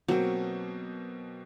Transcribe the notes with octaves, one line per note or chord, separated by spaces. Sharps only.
B2 F#3 A#3 C4